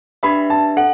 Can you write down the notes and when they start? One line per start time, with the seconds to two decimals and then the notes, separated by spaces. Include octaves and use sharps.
0.23 D4 G4 B4 E5 B5
0.50 A5
0.77 A4 F#5